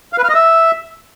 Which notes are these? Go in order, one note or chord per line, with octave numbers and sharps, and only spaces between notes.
F5
B4
F5
D#5
E5